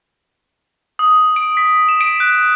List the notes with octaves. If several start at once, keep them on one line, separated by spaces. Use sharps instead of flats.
D#6
D7
B6
E7
D7
F#6